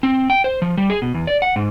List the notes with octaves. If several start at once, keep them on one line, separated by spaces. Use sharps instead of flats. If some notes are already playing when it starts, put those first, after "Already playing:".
C4
G5
C5
F3
G3
G#4
B2
E2
D5
F#5
G#2